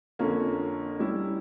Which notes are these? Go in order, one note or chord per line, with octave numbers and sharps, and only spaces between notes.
F2 D3 F3 A#3 C#4
G3 C#4 E4